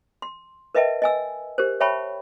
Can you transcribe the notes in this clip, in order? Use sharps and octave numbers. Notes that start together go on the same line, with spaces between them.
C6
A#4 B4 D#5 E5 G5 A5
D#5 G#5 E6
G4 A#4 C5
C#5 E5 G5 A5 B5 C#6